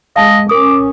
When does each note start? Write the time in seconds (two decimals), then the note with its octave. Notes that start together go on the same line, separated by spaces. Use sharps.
0.16 G#3 D#5 F5 A5
0.49 C#4 A#4 D6 D#6